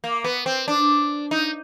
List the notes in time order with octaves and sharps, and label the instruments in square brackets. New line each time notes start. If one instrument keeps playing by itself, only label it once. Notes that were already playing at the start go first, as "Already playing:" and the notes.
[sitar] A#3
B3
C4
D4
D#4